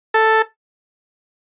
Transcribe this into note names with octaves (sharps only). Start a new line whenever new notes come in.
A4